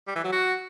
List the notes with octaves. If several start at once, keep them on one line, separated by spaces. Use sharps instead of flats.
G3
E3
F#3
F#4